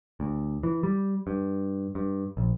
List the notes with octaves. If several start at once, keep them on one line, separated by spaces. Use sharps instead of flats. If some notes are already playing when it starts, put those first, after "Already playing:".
D2
E3
G3
G2
G2
A#1